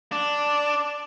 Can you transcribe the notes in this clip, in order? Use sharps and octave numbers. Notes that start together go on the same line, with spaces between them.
D4